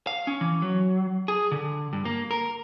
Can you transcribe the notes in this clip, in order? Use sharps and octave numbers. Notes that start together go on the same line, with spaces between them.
F5
C#4
E3
F#3
G#4
D3
G2
A#3
A#4